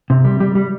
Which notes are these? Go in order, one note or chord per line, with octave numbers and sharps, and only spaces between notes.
C3
G3
G3
G3